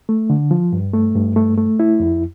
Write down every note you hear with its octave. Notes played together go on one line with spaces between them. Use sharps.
A3
D3
F3
G2
A3
G2
A3
A3
E4
F2